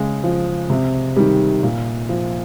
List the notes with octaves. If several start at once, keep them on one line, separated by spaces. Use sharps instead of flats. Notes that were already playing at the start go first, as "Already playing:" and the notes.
Already playing: C#3 G#3
F3
C3
D#3 G3
A#2
F3